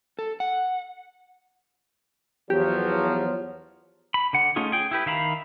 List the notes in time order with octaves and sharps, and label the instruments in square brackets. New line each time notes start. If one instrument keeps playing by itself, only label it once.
[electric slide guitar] A4
F#5
[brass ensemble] E2 F3 F#3 [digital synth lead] G4
[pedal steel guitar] B5
D3 F#5
A3 C#4 D#4 F4 G#4
G#4 G5
E4 G4 B4
D#3 E5 F5 A#5 B5